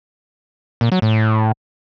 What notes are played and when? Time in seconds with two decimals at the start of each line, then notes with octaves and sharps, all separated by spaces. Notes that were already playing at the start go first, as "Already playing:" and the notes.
0.81 A#2
0.92 F#3
1.02 A2